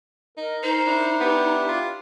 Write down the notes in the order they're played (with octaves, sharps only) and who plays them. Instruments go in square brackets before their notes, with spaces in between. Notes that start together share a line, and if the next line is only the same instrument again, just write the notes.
[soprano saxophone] D#4 [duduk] A#4
[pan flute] D#4 [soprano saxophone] C5
[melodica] D4 E4
[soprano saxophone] B3 [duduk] G4
[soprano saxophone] F4